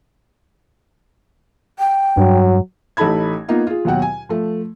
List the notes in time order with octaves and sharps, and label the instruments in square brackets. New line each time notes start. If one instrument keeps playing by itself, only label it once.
[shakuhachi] G5
[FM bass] G2 [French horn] F#3
[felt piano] A1 D#4 A4 A5 B5 G#6
A#3 B3 D#4 F4
F4 G#4
D#2 B2 F#3 F#5 G5
G#5
F3 A3